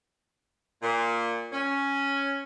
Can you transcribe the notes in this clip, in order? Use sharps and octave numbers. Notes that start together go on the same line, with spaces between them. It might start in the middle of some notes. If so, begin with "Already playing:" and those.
A#2
C#4